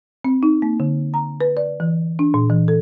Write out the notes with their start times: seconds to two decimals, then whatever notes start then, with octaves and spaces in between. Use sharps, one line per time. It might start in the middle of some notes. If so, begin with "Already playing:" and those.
0.25 C4
0.43 D#4
0.62 A#3
0.80 D3
1.14 A#5
1.41 B4
1.57 D5
1.80 E3
2.19 D4
2.34 A#2
2.49 E3
2.68 A4